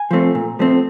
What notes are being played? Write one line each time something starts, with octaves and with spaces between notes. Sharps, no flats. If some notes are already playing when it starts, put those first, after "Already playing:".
Already playing: G#5
F3 A3 C4
A#2
F3 A3 C4